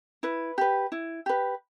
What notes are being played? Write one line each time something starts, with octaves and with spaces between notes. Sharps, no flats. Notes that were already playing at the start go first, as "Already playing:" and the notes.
E4 B4
G4 B4
E4
G4 B4